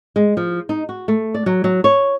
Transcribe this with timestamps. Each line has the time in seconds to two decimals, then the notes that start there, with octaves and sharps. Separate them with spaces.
0.16 G#3
0.37 F3
0.69 D#4
0.89 F#4
1.08 A3
1.34 D5
1.46 F#3
1.64 F#3
1.84 C#5